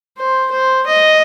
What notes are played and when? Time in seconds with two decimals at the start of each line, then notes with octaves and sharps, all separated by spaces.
0.18 C5
0.51 C5
0.87 D#5